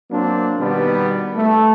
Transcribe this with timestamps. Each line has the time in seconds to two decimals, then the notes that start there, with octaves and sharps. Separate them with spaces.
0.11 F#3 A#3 C4 D4
0.59 B2 D#3 G3 B3
1.35 A3